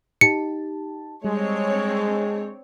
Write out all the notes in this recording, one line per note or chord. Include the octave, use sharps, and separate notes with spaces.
D#4 G4 A5 C#7
G3 G#3 C4 D4 C#5